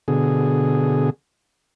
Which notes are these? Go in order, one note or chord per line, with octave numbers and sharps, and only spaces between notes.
B2 D3 G#4